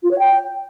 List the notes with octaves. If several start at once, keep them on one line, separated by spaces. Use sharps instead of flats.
F4
C#5
G5